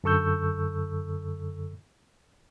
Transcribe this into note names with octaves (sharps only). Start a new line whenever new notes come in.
F#2 D3 A4 C#6 E6 G6